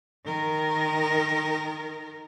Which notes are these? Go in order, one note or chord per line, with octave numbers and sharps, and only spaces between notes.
D#3 A#4